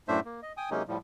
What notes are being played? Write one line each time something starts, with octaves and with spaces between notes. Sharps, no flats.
F#2 A2 A3 D4 C5 E5
A#3
D#5
G5 G#5 D#6
C3 F#3 G#3 A#3 C#4 D#4
A2 F3 G3